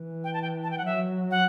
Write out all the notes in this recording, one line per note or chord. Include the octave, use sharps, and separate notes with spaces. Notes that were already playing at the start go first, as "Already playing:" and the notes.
Already playing: E3
G5
A5
G5
A5
G5
F#5
F#3 E5
F#5